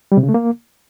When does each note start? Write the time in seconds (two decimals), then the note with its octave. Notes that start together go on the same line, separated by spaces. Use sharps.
0.12 G3
0.17 C3
0.23 C#3
0.29 A3
0.34 A#3